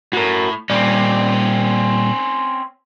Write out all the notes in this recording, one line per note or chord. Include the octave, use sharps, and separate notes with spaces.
A2 F#4 A#4
A#2 G3 C4 C#4 D5